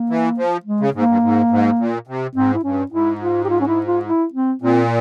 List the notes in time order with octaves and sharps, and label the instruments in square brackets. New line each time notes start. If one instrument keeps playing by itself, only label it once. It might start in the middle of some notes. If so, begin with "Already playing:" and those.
Already playing: [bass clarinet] A#3
[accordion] E3
F3
[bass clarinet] G#3
[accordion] C#3
[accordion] G#2 [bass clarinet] A#3
[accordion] G2
G#2
G#2
A#2
C3
[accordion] G#2 [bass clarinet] C4
[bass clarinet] E4
[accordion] G2 [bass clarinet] C#4
[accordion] G#2 [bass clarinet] E4
[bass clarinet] F4
G4
F4
C#4
E4
F4
E4
C4
[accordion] A#2 [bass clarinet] C4